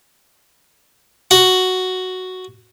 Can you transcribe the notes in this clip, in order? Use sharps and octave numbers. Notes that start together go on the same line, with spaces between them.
F#4